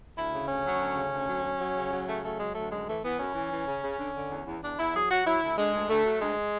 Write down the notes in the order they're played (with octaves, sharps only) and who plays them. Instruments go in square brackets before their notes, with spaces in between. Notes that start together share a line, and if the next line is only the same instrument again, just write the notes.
[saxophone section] D2 E4
C#3
D2 C#4
F#3
D2
C#3
D2
F#3
F#3
F#3
C#3
F#3
C#3 A3
F#3 A3
F#3 G#3
D2 A3
F#2 G#3
E3 A3
E3 B3
F#2 C#4
E3
E3
C#3
C#3
D3
D3
E2
E2
E2 D4
E2 E4
F#3 G#4
F#3 F#4
F#3 E4
D2
D3 G#3
D2
D2 A3
F#3
D2 G#3